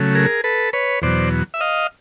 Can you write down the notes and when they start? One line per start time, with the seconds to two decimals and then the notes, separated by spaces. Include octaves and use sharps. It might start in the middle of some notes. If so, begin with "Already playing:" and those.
Already playing: C#3 F#3 A3
0.15 G#4 A#4
0.44 A4 B4
0.73 B4 C#5
1.02 E2 B2 F#3 C5 D5
1.54 E5
1.61 D#5 F5